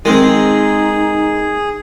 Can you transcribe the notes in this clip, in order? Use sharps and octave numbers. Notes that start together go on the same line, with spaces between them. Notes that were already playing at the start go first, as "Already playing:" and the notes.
D#3 G#3 C4 D#4 G#4